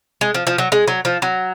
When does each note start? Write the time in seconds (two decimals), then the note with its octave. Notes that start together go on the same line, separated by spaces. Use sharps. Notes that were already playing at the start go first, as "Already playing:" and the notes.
0.21 G#3
0.34 F3
0.47 F3
0.58 F#3
0.72 G#3
0.88 F#3
1.05 F3
1.22 F#3